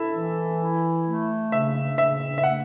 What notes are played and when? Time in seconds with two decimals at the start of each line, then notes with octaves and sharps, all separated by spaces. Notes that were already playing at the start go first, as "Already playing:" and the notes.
Already playing: E4 A4 E5
0.16 E3
0.61 E4
1.07 A3
1.52 C#3 E5
1.98 C#3 E5
2.38 E5
2.43 A3 F#5